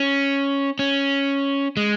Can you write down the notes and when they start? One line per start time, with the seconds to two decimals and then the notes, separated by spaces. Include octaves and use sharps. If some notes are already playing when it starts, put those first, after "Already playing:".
Already playing: C#4
0.79 C#4
1.77 G#3